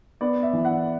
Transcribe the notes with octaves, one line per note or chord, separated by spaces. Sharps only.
B3 D5
E5
E3
F#5